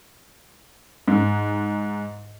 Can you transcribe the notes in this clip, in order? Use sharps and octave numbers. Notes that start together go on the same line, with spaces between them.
G#2